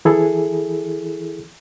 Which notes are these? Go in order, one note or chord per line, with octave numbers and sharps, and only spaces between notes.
E3 E4 G#4 A4